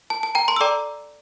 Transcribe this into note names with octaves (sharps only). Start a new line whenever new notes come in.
A5
A5
G5 A#5
A5 C6
E6
A4 D5 G5 A#5 D6